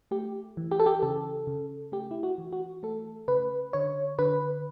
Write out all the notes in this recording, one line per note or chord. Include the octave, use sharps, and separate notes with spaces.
A3 G4
E3
G4
A4
G4
C#3 A4
C#3
A3 G4
E4
F#4
E3
F#4
A3 A4
C#3 B4
D3 C#5
D3 B4